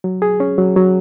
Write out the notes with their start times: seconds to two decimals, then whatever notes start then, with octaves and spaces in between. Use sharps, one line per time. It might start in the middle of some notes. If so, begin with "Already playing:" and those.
0.04 F#3
0.22 G#4
0.40 C#4
0.58 F#3
0.76 F#3